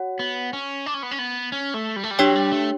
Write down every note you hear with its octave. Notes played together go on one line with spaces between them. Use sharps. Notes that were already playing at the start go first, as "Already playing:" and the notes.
Already playing: F#4 C#5 F#5
B3
C#4
D4
C#4
B3
C#4
B3
C#4
A3
G3
A3
G3
F#3 D4 G4 C#5 G5
G3
A3